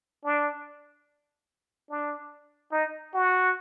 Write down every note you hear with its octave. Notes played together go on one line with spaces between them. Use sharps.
D4
D4
D#4
F#4